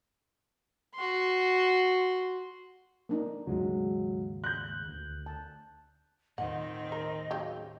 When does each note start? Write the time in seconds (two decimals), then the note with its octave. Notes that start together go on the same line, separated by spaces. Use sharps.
0.95 F#4 C6
3.09 A#3 D4 D#4
3.47 D#2 G#2 C#3 F#3 G#3
4.44 F#6 G6
4.88 D2
5.26 A5
6.38 D#2 A2 D#3 C4 D#5 F#5
6.92 A#4
7.31 C#3 F#3 G4